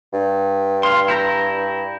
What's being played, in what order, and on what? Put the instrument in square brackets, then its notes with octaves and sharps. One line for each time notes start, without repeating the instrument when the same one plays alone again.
[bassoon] G2
[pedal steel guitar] F5 C6
E4 G4 A#5